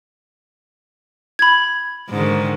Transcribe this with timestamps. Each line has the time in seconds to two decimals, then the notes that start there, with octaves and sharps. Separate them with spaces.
1.39 B5 G#6
2.10 G#2 D3 D#3